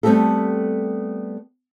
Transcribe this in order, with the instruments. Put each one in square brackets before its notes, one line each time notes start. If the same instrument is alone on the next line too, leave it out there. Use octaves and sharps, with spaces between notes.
[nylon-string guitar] G3 A3 B3 C4 G4 A4